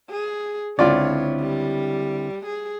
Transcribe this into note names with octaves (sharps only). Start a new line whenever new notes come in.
G#4
C#2 D3 C4 E4 F4 C#5 D5
G3
G#4